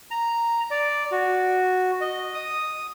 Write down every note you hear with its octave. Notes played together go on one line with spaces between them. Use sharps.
A#5
D5
F#4
D#5
D#6